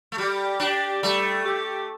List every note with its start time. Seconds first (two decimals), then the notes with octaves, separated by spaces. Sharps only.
0.12 A3
0.18 G3 G4
0.60 D4 G4
1.03 G3 A3
1.45 G4